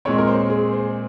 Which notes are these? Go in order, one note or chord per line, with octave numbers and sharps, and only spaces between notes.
A#2 G#3 C4 C#5
A#4
C5
G#4
C5